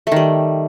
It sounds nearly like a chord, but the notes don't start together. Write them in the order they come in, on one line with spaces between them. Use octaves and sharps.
A3 D#3 G3